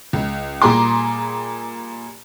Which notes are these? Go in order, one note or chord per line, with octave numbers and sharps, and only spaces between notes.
C#2
A#2 G3 G#4 A#5 C6 D6